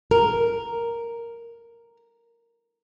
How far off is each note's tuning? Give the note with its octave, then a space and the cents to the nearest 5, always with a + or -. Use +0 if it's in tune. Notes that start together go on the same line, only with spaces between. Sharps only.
A#4 +0